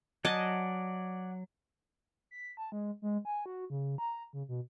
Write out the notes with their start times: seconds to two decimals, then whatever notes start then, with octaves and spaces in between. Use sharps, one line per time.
0.25 F#3 D5 D#5 F#5 G#5 A5
2.31 B6
2.57 A5
2.72 G#3
3.02 G#3
3.25 G#5
3.46 F#4
3.70 C#3
3.98 A#5
4.33 C#3
4.48 B2